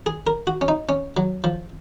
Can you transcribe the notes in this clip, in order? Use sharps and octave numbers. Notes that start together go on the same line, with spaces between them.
G#4
A#4
F#4
C#4
D#4
C#4
F#3
F3